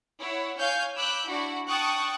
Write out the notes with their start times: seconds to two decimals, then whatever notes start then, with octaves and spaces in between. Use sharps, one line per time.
0.19 E4 C#5 F#5
0.58 C#5 F5 G#5 F6 G6
0.96 B5 D6 E6 F#6 G6
1.28 D4 E4 F#4 F#5
1.68 G5 A5 C#6 D#6 F#6